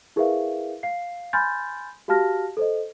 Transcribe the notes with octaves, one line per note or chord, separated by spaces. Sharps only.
E4 G#4 A#4 B4 E5 F5
F5 C7
G#5 B5 C6 F6 G6 A6
F#4 G4 F5 A5 F6 A#6
A4 C5 D#5